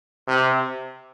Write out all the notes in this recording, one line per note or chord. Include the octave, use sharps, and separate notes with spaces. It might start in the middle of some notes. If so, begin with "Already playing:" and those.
C3